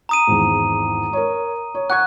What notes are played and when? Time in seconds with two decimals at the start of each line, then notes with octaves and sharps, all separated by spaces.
0.09 A#5 D#6 D#7
0.27 G#1 E2
1.13 A#4 C#5
1.75 C#5
1.90 F#5 C#6 F#6 G#6